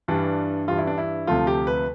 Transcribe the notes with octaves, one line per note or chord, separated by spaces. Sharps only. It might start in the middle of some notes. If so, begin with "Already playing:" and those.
G2 E3 G3 D4
G2 E3 G3 F4
E4
D4
E4
D2 C3 F3 A3 F4
G4
B4